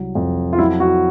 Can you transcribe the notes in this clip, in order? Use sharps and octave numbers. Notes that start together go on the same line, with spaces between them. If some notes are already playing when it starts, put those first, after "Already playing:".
Already playing: C2 F#3
F2
F4
F#3 E4
F#4